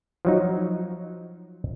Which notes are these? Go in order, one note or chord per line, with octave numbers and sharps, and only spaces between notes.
F3 F#3 D#4